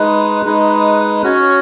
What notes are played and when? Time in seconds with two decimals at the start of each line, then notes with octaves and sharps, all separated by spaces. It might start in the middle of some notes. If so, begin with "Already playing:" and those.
Already playing: G#3 D#4 B4
0.46 G#3 D#4 B4
1.23 C#4 F#4 C#5